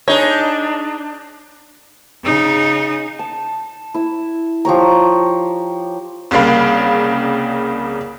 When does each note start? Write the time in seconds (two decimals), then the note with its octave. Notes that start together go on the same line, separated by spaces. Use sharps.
0.08 D4 D#4 G#4 C#5
2.24 C#3 D#4
3.19 A5
3.94 E4 E6
4.65 F3 G4 C#5 A#5
6.31 C2 C#3 G3 A#3 F5 B5